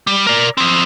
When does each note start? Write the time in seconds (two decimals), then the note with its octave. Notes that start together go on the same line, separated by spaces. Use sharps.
0.07 G3
0.27 A#4 D5
0.57 F3 C4